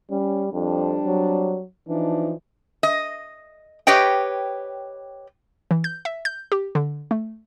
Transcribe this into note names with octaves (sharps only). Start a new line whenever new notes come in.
G3 C#4
F2 G3 C4 D4
F#3
E3 F3 D4 D#4
D#5
G4 B4 C#5 D#5 G5
E3
G6
E5
G6
G4
D3
A3